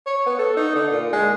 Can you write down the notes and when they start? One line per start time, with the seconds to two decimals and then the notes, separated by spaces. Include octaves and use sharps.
0.06 C#5
0.26 B3
0.38 A4
0.56 D#4
0.75 D3
0.92 A#2
1.13 G#3